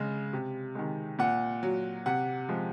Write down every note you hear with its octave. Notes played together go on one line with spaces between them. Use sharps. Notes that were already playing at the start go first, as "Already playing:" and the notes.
Already playing: C#3 G#3
C3
D#3 G#3
A#2 F#5
F#3
C3 F#5
F3 G#3